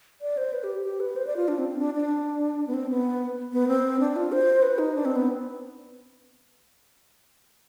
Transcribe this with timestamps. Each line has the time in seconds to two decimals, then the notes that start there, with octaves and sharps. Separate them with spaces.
0.21 D5
0.37 C5
0.53 B4
0.64 G4
0.84 G4
1.00 B4
1.16 C5
1.27 D5
1.36 F4
1.48 D4
1.58 C4
1.69 C4
1.79 D4
1.94 D4
2.67 B3
2.74 C4
2.90 B3
3.52 B3
3.68 C4
4.00 D4
4.16 F4
4.32 C5
4.62 B4
4.78 D#4
4.95 D4
5.05 C4
5.16 B3